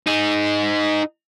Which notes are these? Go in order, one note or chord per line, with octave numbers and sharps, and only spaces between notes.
D#4 G#4